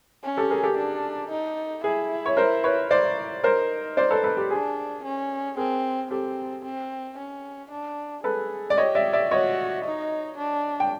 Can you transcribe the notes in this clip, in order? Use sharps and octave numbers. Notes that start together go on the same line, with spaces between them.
C#4
G4 A4
G#4 A#4
G4 A4
D4
D#4
E4 G#4
C#5
A#4 C5
B4 C#5
E4 C5 D5
D#4 A#4 C5
C5 D5
A4 B4
A4 B4
G4
D4 G#4
C#4
C4 G#4 A#4
C4 G4 A4
C4
C#4
D4
G#4 A4 B4
D5
G4 C#5 D#5
D5 E5
D5 E5
F#4 C#5 D#5
D#4
D4
G5